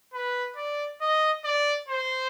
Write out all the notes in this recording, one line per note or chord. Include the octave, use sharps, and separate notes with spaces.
B4
D5
D#5
D5
C5